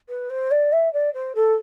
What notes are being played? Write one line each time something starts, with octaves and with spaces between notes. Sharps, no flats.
B4
C5
D5
E5
D5
C5
A4